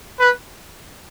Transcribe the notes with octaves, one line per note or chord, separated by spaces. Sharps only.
B4